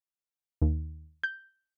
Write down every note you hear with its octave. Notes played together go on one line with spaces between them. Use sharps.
D#2
G6